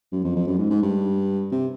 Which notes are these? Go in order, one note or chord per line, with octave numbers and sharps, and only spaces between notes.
F#2
F2
F2
F#2
G#2
G#2
G2
C3